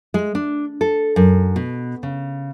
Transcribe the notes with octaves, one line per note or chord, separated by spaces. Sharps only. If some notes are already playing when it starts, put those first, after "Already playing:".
G#3
D4
A4
F#2
B2
C#3